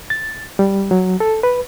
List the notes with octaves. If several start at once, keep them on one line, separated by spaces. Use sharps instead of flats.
A6
G3
F#3
A4
B4